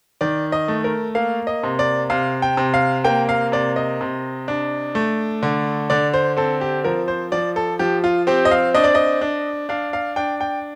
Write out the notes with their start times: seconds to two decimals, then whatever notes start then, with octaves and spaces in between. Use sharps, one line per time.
0.21 D#3 D5
0.52 D#5
0.68 A3
0.84 A#4
1.15 A#3 F5
1.47 D#5
1.63 C3
1.79 D5
2.10 C3 F5
2.42 G5
2.57 C3
2.74 F5
3.04 A#3 G5
3.29 F5
3.52 C3 D5
3.76 D#5
4.01 C3
4.48 D4
4.95 A3
5.43 D3
5.90 D3 D5
6.14 C5
6.37 C4 A4
6.61 G4
6.84 F3 A#4
7.08 C5
7.32 F3 D5
7.56 A4
7.79 F3 G4
8.04 F4
8.27 C4 G4
8.45 D#5
8.51 F5
8.74 D4 D#5
8.84 D5
8.95 D#5
9.21 D4
9.69 D4 F5
9.93 F5
10.16 D4 G5
10.41 G5